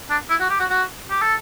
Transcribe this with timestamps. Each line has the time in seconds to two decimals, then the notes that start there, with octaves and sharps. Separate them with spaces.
0.10 D4
0.30 E4
0.40 F#4
0.50 G4
0.60 F#4
0.70 F#4
1.10 G4
1.22 A4